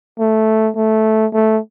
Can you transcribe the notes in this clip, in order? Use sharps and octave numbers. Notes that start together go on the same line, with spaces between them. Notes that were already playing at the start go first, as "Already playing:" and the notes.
A3
A3
A3